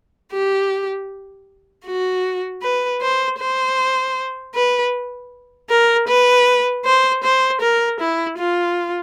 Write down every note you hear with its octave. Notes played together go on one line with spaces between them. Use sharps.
G4
F#4
B4
C5
C5
B4
A#4
B4
C5
C5
A#4
E4
F4